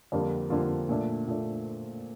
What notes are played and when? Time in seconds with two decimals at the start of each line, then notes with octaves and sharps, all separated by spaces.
0.12 F2 D3 G3 A#3 F4
0.50 F2 D3 G3 A#3 F4
0.89 A#2 A3 D4
1.27 A#2 A3 D4